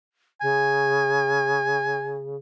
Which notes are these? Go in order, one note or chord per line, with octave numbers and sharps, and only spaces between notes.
C#3 G#5